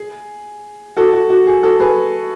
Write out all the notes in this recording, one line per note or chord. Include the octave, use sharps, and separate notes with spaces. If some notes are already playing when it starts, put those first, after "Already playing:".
Already playing: G#4
F#4 A4
F#4
F#4
G#4
F#4 A4
G#4 B4